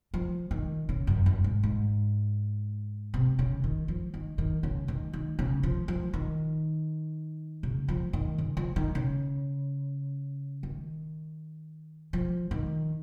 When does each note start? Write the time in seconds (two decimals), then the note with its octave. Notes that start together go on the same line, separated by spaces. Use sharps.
0.14 F3
0.51 D#3
0.89 C#3
1.07 F#2
1.26 F#2
1.44 G#2
1.63 G#2
3.14 C3
3.39 C#3
3.64 D#3
3.88 F3
4.14 D#3
4.38 D#3
4.63 C#3
4.88 D#3
5.13 D#3
5.39 C#3
5.63 F3
5.88 F3
6.14 D#3
7.63 C#3
7.88 F3
8.13 D#3
8.38 C#3
8.57 F3
8.76 D#3
8.95 C#3
10.63 D#3
12.13 F3
12.51 D#3